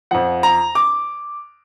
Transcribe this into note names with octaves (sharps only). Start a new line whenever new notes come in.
F2 F3 F#5
A#5
D6